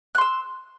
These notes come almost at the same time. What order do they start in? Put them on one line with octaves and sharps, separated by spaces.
F#6 C6 E6